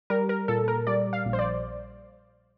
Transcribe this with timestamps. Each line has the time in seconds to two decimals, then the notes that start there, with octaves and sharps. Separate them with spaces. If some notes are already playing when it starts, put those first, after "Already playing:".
0.10 G3 A#4
0.29 A#4
0.48 A#2 A4
0.68 A#4
0.87 G3 D5
1.13 F5
1.26 A#1
1.33 C5
1.39 D5